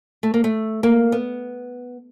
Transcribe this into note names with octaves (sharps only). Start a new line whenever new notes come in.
A3
A#3
A3
A#3
B3